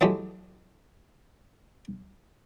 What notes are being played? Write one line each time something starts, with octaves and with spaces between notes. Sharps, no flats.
E3 F#3 G#3 A3 G4